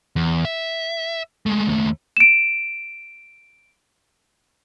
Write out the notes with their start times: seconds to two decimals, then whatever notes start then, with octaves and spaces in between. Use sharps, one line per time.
0.16 E2
0.45 E5
1.46 G#3 A3
1.67 D#2 A3
2.17 D7 E7